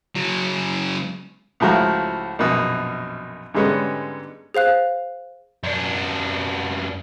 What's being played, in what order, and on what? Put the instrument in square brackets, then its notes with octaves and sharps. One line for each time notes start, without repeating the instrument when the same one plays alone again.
[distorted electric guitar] C#3 F#3
[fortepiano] C#2 A2 F3 F#4 A#5
A#1 F#2 B2
G#2 D3 G3 G#3 B3 C#4
[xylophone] G#4 C5 F5 F#6
[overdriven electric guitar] F#2 D4